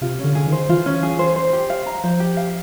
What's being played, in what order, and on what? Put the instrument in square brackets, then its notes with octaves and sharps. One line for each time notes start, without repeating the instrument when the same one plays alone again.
[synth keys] C3 [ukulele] F4
[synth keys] D3 [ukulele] C#4
[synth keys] D3 [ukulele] G#4
[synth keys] D#3
[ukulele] C5
[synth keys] E3 [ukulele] F4
[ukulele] C#4
G#4
C5
C5
G4
F5
A#5
[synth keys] F3 [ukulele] C5
[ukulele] G4
F5